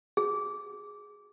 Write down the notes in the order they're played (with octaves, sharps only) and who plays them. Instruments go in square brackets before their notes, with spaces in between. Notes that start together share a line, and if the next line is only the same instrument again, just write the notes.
[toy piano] G#4